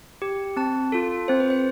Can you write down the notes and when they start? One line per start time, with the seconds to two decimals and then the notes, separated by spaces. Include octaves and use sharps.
0.22 G4
0.57 C4 A5
0.92 F4 A4
1.28 C4 C5
1.40 B4
1.50 C5